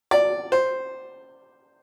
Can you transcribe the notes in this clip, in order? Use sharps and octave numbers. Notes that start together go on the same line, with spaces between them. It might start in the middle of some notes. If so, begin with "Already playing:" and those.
D5
C5